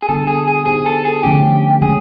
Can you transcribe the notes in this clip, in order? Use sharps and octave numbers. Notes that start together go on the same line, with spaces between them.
G#4
D3 G3 B3 D4 F4 A4
G#4
G#4
B3 D#4 G4 G#4 C5
A4
G#4
D3 F3 A3 C#4 E4 G4
C#3 F3 G#3 C#4 G#4